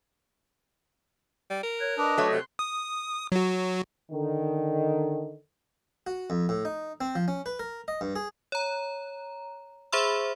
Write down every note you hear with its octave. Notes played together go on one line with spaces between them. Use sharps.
G3
A#4
C#5 F#6 G#6
D4 B4 D#5 D6 D#6
F#3 A3 C#5
C3 C6 F#6
D#6
F#3 F#4
D3 D#3
F#4
F2
A2
D#4
C4
F3
C#4
B4
A#4
D#5
G2
G#4
C#5 A#5
G#4 C5 E5 B5 C6 E6